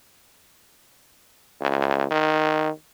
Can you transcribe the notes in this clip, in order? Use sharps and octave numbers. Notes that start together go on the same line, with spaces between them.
C#2
D#3